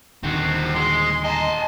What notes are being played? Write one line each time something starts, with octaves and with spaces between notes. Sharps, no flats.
D#1 D3 D#3 C4 F#4
G#3 C6
D#5 G#5 A5